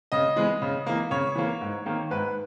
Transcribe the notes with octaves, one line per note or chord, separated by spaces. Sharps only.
C#3 D#5
E3 G#3 B3
C#3
E3 A#3
C#3 C#5
E3 A#3
G#2
D#3 A#3
G#2 B4